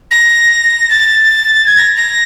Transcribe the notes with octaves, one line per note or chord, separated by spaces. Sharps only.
A#6
A6
G#6
A#6
A#6